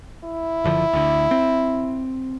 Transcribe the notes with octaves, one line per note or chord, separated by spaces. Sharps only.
E4
F#1 D3 F3
D2 D3
C4